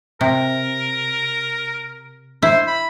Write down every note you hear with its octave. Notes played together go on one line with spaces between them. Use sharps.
C3 A#4
E4 C5
B5